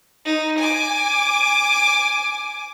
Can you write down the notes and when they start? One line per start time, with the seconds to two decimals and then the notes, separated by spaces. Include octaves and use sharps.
0.25 D#4
0.58 G#5 D6